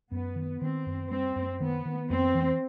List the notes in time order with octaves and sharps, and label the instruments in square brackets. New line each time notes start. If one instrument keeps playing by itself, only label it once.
[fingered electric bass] F#2 [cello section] B3
[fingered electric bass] D#3
[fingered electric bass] D#3 [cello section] C4
[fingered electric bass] F#2
[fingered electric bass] G3 [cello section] C4
[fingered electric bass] F#2
[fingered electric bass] D#3 [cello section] B3
[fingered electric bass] D#3
[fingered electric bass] F2 [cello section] C4
[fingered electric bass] E3